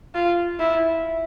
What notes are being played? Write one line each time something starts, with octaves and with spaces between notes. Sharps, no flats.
F4
E4